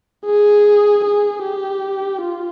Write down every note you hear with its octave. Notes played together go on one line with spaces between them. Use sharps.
G#4
G#4
G4
F4